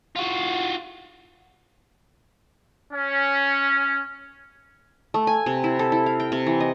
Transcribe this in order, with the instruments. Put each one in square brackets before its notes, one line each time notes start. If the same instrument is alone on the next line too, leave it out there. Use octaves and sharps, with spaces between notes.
[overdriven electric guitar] F4 F#4
[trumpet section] C#4
[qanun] A3
G#5
C3
E4
A4
E4
F5
G5
C3
E3
D#5